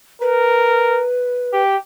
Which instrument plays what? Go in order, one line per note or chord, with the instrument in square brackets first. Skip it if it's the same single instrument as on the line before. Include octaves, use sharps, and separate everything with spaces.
[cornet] A#4 [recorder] B4
[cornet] G4